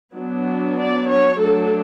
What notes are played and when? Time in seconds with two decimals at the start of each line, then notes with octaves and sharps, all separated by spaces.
0.15 F#3 B3 D4
0.78 D5
1.09 C#5
1.39 F#3 A3 D4 A4